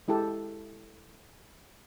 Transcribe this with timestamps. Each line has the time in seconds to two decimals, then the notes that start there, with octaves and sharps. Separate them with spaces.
0.08 G#3 E4 G4 A4